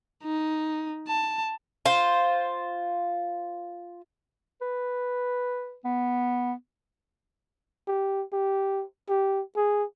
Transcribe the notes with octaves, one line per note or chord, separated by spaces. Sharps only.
D#4
A5
F4 C5
B4
B3
G4
G4
G4
G#4